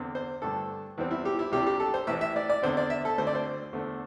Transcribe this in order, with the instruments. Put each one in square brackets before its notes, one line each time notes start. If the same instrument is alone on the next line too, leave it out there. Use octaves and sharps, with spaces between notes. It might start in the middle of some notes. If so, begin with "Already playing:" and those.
Already playing: [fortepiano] E2 D3 C4
C5
G2 D3 A3 D4 A4
E2 E3 G3 C4
E4
G4
E4
C2 C3 G3 D4 G4
G4
A4
C5
A1 A2 E3 E5
E5
D5
D5
E2 D3 C4 C5
D5
E5
A4
D2 D3 C4 C5
D5
C5
E2 D3 A3